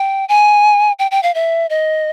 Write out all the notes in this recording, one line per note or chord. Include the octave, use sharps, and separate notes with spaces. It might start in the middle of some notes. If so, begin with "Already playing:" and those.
Already playing: G5
G#5
G5
G5
F5
E5
D#5